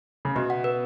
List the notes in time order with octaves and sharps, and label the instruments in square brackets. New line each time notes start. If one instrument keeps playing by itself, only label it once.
[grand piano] C#3
[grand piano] B2 [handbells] B3
[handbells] F#5
B4